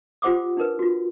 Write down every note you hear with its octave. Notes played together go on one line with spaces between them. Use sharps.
F4 G4 C5 F#5 D6 D#6
D4 D#4 A#4 B4
F4 F#4